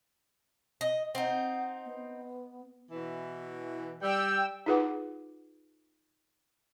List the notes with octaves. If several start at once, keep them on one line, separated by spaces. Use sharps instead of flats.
D#5
C4 D#4 F#5
B3
B2 E3
G3 G5 E6
D#4 F4 G#4 B4 F#5 D6